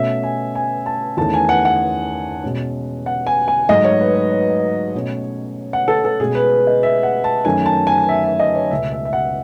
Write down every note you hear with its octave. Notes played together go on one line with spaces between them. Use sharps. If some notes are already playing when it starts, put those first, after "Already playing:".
Already playing: B2 A3 C#4 E5
G#5
G#5
A5
E2 D#3 A3 C#4 A5
G#5
F#5
F#5
B2 G#3 C#4
F#5
G#5
G#5
G#2 F#3 A3 D#5
C#5
B4
B4
C#5
B2 A3 C#4
F#5
A4
A4
B2 G#3 C#4 G#4
B4
D#5
E5
F#5
A5
F#2 D#3 A3 C#4 G#5
A5
G#5
E5
E5
D#5
C#5
C#2 B2 A3 E5
E5
E5
F#5